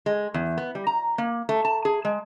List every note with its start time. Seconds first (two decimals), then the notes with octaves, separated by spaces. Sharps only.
0.06 G#3
0.34 E2
0.58 B3
0.75 G3
0.87 A#5
1.18 A#3
1.49 A3
1.65 A5
1.85 G#4
2.05 G#3